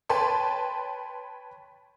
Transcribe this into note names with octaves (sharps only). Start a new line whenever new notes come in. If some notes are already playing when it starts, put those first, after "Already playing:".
B4 C#5 G5 A5 C6